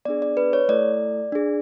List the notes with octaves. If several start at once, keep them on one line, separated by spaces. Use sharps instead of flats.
B3 D4 G#4 D5
D5
B4
C#5
A3 E4 A4 D5
D4 G#4